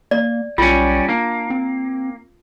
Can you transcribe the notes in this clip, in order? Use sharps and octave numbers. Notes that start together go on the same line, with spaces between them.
A#3 D5
B1 G3 C#4 F4
A#3 D4
C4